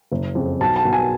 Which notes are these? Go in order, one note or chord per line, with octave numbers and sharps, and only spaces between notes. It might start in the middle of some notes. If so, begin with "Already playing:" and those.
F#1
F2 C#3
B1 A5
A5
B2
G#5